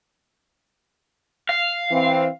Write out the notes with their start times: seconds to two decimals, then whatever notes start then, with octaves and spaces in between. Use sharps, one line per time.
1.49 F5
1.90 E3 C4